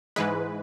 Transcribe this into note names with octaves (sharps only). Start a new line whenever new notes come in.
G#2 E3 G#3 B4